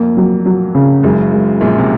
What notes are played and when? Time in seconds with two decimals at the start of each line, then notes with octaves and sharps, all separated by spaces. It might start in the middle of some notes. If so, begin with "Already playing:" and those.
Already playing: F2 A#3
0.17 F#3
0.45 F#3
0.75 C#3
1.03 F#1 F#2 G#3
1.33 G#3
1.61 A#1 A#2 G#3
1.78 C3